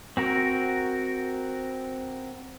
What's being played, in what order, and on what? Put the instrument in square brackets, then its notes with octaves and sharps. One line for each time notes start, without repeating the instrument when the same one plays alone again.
[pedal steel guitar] C4 F#4 A#4